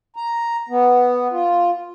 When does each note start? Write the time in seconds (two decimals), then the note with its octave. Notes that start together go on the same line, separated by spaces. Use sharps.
0.16 A#5
0.69 B3
1.31 F4